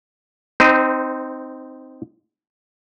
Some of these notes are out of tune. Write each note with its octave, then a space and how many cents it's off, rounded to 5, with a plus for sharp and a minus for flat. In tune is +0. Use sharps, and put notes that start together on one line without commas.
C4 -5 D#4 +0 C5 -35